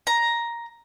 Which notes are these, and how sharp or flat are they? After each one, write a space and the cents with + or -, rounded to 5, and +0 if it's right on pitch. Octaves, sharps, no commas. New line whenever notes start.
A#5 +10